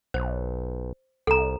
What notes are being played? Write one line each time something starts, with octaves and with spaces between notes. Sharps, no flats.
B1 C5
C2 A4 A#5